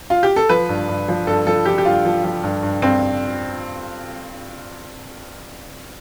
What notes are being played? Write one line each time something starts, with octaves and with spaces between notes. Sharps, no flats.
F4
G4
A4
F3 B4
G2
G2
F3
G2 A4
F3 A4
F3 G4
G4
G2 F4
F3
F3
G2
G2
G2 C4